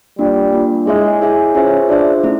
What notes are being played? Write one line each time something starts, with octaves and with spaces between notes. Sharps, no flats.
G3 A#3 D4 F4
A#3 D4 F4
G#3 E4 G#4 C#5 E5 G#5
E4 G#4 C#5 E5 G#5
C#4 F4 G#4 C5 E5
D4 F4 G#4 C5 E5
A3 C#4 E4